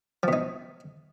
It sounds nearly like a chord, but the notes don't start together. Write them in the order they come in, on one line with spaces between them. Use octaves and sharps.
F3 B2 D#4